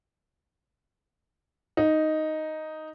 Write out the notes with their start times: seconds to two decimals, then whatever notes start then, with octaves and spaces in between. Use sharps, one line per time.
1.77 D#4